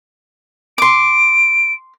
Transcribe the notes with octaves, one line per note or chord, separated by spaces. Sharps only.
C6 D6 D7